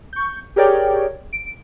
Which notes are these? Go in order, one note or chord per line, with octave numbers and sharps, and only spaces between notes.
C#6 G6
G4 G#4 A#4 C#5 D5 G5
D7